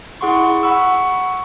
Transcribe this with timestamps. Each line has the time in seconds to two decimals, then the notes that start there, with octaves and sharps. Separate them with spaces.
0.21 E4 G#4 F#5 C6 C#6
0.63 F#5 B5 C#6 E6